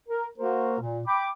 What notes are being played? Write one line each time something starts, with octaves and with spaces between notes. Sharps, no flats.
A#4
A#3 F#4 A#4 C5
A#2
G5 B5 D6